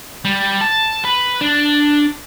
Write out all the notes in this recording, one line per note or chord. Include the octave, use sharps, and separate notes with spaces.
G3
A5
B4
D4